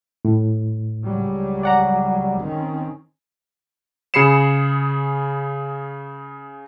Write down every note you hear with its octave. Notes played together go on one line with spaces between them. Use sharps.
A2
C#2 F#3 G3
D5 F#5 A#5
D#3 C4 C#4
C#3 G#4 B5 C7 C#7 E7